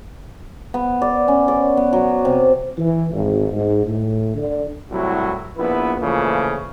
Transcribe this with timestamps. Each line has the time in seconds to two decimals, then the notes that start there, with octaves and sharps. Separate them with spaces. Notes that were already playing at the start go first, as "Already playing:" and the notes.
0.74 B3
1.02 D5
1.28 C#4
1.48 D5
1.77 B3
1.93 F#3
2.25 C3
2.78 E3
3.13 G#1
3.52 G#2
3.85 A2
4.35 D3
4.91 C2 A2 F#3 E4 F#4
5.58 A#1 B3 E4 B4
6.00 A#2 C#3 E3 F3 A3